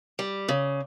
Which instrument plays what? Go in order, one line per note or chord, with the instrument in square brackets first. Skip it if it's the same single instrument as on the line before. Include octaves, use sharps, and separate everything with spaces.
[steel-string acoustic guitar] G3
C#3